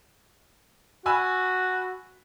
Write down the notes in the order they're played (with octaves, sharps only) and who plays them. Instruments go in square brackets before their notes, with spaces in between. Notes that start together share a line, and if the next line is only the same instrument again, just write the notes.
[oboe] F#4 [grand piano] G#5 B5 E6